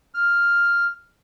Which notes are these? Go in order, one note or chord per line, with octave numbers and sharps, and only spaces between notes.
F6